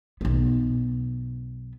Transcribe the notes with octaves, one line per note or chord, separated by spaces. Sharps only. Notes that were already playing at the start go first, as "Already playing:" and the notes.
B1 B3